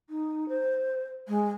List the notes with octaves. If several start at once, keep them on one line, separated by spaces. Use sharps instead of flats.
D#4
C5
G#3